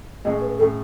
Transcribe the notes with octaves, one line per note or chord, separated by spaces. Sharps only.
A2 G#3 C#4 G#4 D#5
B4
A2 G#3 C#4 G#4 A4